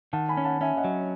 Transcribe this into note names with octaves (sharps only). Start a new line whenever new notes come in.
D#3 F#5 A5
G#5 B5
C#4
F#5 A5
C#4 E5 G#5
D#5 F#5
F#3